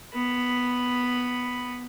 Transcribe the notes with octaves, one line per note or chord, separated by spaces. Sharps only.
B3 B5